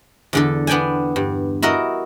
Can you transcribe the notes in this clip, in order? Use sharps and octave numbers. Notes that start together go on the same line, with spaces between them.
E2 D3 A4
B3 D4 D5 G5 G#5
G2
E4 F#4 A#4 D#5